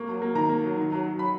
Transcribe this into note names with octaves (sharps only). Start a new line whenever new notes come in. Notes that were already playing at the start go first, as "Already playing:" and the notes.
Already playing: A#3 C#6
F#3
A#3
D#3 A#5
A#3
F#3
D#3
F#3
F#3
F#3 B5